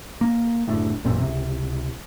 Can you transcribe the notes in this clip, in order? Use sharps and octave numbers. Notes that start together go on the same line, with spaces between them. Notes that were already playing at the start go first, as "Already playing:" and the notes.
A#3
F#1 A2 D3
A1 F#2 A#2 C4
C#2 C3